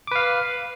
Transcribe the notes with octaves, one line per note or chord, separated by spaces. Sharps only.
B4 F5 D6